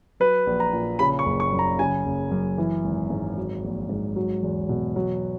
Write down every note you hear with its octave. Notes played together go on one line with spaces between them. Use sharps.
F#3 B4
A#1
A#5
A#2
C#3 B5
C#6
F#1
C#6
F#2
A#5
C#3 G#5
F#1
F#2
E3
G#1
G#2
F#3
A#1
G#2
F#3
E2
B2
F#3